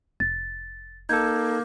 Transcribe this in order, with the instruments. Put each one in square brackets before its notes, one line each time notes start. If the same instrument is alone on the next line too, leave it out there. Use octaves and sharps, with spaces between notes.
[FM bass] F1 [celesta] A6
[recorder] A#3 [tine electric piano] D#4 A4 [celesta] G6 G#6